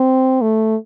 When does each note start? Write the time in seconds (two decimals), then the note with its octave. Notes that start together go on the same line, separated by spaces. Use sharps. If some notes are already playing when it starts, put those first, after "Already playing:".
Already playing: C4
0.41 A3